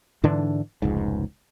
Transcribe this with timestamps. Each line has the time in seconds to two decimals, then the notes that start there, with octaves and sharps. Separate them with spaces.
0.23 G#2 D3 E3 D4
0.82 F1 C#2 G#2